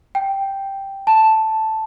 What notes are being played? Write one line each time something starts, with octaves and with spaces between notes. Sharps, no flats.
G5
A5